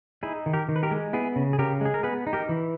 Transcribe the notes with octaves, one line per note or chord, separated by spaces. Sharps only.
D#4 E4 G#4
D#3
G4 A#4
D#3
B4
G4 A#4
G#3
B3 E4 G#4
C#3
G#4
C#3 G4 A#4
G#3 G#4
A#4
B3 G#4 B4
D#4
G4 A#4
E3